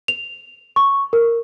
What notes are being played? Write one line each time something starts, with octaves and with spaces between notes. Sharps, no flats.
F7
C#6
A#4